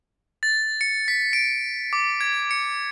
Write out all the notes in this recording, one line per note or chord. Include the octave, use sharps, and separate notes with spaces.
A6
C#7
B6
D7
D6
G#6
C#7